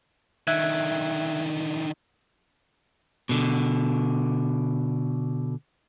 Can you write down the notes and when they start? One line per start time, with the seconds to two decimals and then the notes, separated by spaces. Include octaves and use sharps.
0.47 D3 D#3 E5 F#6 G#6
3.29 B2 D3